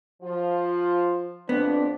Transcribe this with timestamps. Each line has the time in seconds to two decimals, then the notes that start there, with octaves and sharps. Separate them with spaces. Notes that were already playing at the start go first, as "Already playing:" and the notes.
0.23 F3 F4
1.49 F2 B3 C4 D4